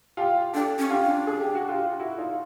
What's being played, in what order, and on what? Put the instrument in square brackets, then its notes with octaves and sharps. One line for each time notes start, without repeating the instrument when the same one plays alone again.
[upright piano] F4 G4
[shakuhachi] D4 [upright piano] G4 A4
[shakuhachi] C#4
[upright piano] F4 G4
[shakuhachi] D4
[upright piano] G#4
G4
F#4
F4 G4
E4 F#4
D#4 F4